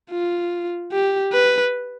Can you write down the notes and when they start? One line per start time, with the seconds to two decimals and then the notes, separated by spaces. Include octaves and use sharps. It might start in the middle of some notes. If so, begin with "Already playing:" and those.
0.10 F4
0.92 G4
1.32 B4